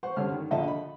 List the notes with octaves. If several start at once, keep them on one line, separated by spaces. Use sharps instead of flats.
C5 F#5 C#6
G2 D3 C#4 F6
D#3
A#1 D3 F3 D#5 E5 A5
B5